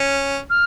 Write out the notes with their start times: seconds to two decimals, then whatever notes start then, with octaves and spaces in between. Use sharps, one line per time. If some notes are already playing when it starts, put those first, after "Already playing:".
Already playing: C#4
0.50 F6